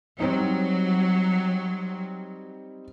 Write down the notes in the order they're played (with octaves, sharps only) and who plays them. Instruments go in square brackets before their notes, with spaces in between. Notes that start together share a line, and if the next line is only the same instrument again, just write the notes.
[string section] F#3 [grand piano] G3 C4 D#4